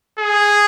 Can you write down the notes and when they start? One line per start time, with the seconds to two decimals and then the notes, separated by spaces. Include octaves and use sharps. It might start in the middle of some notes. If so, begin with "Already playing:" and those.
0.19 G#4